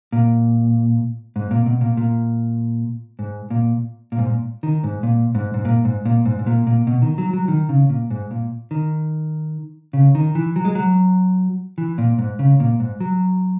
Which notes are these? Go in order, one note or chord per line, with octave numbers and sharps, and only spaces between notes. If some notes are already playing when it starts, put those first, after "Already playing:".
A#2
G#2
A#2
B2
A#2
A#2
G#2
A#2
A#2
G#2
A#2
D#3
G#2
A#2
G#2
G#2
A#2
G#2
A#2
G#2
G#2
A#2
A#2
B2
D#3
F#3
F#3
D#3
C#3
A#2
G#2
A#2
D#3
C#3
D#3
E3
F#3
G#3
F#3
E3
A#2
G#2
C#3
A#2
G#2
F#3